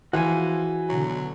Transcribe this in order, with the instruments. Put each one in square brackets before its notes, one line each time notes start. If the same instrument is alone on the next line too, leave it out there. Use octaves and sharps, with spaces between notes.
[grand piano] E3 [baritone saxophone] F3 [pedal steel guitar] F#4 G#4 G#5
[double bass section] B2 D3 [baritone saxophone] F#3